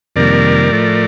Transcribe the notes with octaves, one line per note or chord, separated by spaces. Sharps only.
F2 C3 D#3 G3 A#3 A#4 D5
A2 F3 A3